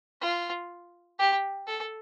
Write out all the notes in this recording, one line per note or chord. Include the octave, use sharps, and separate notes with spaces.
F4
G4
A4